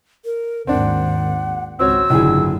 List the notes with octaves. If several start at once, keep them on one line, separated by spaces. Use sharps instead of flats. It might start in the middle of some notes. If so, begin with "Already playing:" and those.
A#4
G#1 D#2 G#2 C4 D4 F#5
G#1 C#2 C4 F#4 C#5 E6
F#1 C#2 G#2 D3 F#3 E4 G#4